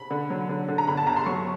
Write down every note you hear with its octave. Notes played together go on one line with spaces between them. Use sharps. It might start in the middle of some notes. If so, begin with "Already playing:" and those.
Already playing: B5
D3
F#3
D3
D3
A#5
G1 B5
A5
G1 A#5
C6
F#3 C#6